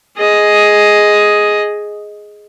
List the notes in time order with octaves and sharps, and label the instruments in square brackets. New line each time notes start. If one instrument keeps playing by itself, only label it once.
[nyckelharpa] G#4 D#5